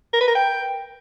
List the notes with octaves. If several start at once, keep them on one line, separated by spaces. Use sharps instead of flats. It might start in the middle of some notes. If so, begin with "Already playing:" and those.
A#4
B4
A#4
G5